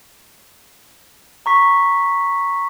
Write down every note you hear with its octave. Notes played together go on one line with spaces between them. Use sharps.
A#5 C#6 B6